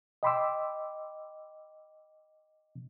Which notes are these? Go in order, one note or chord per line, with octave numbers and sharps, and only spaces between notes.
D#5 G5 B5 C6 D6 E6